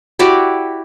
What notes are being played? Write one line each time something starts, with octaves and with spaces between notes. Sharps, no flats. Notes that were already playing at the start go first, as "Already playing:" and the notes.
E4 F#4 G4 D5